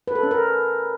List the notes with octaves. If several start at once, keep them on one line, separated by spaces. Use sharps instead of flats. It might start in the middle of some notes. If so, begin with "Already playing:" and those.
B4
A4
C#4
A#4